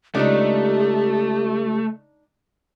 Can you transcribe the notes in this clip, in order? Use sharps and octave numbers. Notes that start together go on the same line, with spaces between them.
C#2 A3 D4 D#4 G4